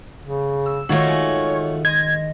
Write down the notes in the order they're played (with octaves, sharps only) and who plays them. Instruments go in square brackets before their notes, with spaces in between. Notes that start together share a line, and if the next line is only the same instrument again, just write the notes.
[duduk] C#3
[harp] E6
[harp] D#3 G#6 A#6 [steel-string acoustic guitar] A3 F4 F#4 [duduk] C#5
[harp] G#3 G#4
[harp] D#5 C6 A#6 [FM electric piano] G#6